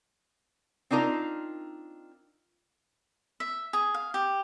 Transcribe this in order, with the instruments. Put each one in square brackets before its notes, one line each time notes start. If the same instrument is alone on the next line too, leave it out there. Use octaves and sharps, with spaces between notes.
[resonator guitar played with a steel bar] C4 D4 D#4 F4 A#4
[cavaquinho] E5
G#4
F5
G4